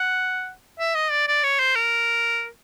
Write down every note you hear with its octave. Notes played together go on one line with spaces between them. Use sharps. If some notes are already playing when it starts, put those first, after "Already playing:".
Already playing: F#5
E5
D#5
D5
D5
C#5
C5
A#4